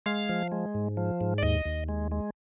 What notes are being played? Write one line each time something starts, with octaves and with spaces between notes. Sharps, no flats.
G#3 F5
F3
G#3
G#2
F3
G#2
D5
D#2 D#5
D#2
G#3
G#3